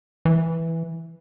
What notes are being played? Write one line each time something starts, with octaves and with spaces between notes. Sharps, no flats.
E3